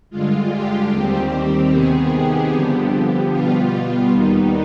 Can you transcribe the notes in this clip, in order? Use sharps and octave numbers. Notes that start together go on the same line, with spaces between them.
G2 D3 G#3 F4
G4
D#2 D#3 G3 C4
C3 D#3 B3 G#4
G4
G2 D3 F3 B3
B2 G3 B3 F4
D#2 D#3 G3 B3 D#4